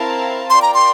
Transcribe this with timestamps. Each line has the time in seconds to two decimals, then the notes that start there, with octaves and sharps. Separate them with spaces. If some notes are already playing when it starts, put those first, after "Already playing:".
Already playing: C4 E4 A#4 F5 A5
0.50 F4 A#4 D5 G5 C6
0.62 A#5
0.74 C6